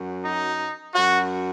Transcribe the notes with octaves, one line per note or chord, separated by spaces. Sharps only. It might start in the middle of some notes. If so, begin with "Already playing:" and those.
Already playing: F#2 F#3
D#4
F#2 F#3 F#4